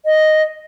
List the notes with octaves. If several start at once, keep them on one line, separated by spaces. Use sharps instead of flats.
D#5